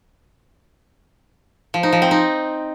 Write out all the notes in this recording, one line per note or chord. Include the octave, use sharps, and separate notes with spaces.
F3
D#4
F3
C4
D#4